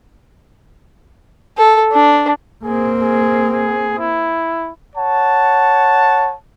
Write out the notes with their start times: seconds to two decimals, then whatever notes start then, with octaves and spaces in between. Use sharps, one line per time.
1.57 A4
1.92 D4
2.64 A#3 C4 G#4
3.02 G#4
3.53 G#4
3.98 E4
4.96 C#5 F#5 A5